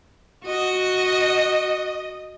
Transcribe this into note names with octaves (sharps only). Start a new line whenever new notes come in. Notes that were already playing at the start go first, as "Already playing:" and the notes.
F#4 D#5